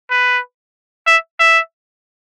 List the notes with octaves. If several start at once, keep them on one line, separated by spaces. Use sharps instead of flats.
B4
E5
E5